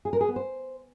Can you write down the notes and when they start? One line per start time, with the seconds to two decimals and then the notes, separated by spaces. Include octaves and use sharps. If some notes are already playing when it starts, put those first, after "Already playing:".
0.05 G#4
0.13 A#4
0.21 G#4
0.28 B3
0.36 C5